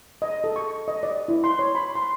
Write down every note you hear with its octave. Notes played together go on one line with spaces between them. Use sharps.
D#5
A4
C#6
D#5
D5
E4
C6
C#5
B5
C6